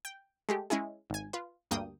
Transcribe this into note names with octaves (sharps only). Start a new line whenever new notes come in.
G5
G#3 A3 G4
G#3 C#4 E4 G#4
G#1 G#5
F4 B4
D2 G2 A#3 G5 D#6